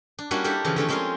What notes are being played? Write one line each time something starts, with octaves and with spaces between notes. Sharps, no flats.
D4
G3 A#3 C#4 D4 E4 F#4
D4 E4 G4 A4 A#4
C#3 E3 F3
D3 A3 C4 C#4
G#3 C4 C#4 F4 G#4 A#4